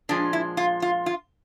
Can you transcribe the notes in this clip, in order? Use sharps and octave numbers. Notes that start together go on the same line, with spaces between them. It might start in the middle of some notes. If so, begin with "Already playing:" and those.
A#2 F3 G#3 D4
E4
F4
F4
F4